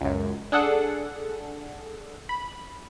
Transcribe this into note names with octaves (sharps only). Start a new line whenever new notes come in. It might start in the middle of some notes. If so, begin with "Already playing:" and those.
C#2 F#2
D4 G#4 A4 F#5
B5